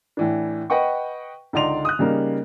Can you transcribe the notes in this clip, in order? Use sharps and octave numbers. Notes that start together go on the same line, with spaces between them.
A2 E3 D4
B4 D#5 F#5 G5 C#6
C#2 D3 D#4 D5 C6 F7
D#6 F#6
C#3 G3 A#3 D#4